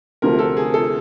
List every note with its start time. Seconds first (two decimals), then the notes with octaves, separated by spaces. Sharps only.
0.22 D2 C3 F3 A3 A#4
0.39 A4
0.57 G#4
0.74 A4